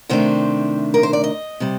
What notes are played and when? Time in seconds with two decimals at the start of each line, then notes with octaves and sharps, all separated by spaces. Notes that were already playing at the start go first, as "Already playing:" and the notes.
0.09 C3 D#3 A3 D4 C5
0.94 A#4
1.03 C5
1.13 D5
1.24 D#5
1.60 C3 G3